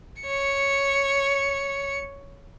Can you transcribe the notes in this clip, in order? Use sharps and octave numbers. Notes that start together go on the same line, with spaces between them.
C#5 C#7